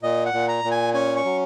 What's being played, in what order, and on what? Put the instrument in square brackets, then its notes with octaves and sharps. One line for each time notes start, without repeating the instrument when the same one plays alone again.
[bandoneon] A#2 D#5
F#5
A#2
A#5
A#2
G#5
C#4 G#5
C#6
F#3